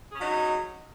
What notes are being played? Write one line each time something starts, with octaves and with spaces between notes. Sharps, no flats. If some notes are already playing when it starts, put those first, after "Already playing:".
F#3 C#4 D#4 G#4